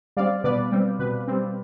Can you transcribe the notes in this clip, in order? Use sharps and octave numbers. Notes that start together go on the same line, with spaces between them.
G3 C4 D5 F5
B2 B4 D5
G3 C4
B2 B4
G3 C4